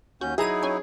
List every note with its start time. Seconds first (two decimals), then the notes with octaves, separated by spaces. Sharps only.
0.21 D#2 C#4 F#4 G6
0.38 F#3 D#4 E4 G#4 E5 A#5 D#7
0.63 C#4 C#5 G#5